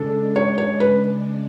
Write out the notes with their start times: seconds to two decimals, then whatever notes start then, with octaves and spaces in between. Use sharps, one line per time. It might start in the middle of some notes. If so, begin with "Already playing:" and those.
Already playing: C#3 G#3 D4 A4
0.36 C#5
0.58 C#5
0.80 B4